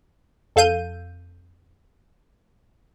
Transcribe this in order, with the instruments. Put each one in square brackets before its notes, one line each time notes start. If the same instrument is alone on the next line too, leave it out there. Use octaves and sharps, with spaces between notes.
[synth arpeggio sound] F2 A4 F5 G6 D#7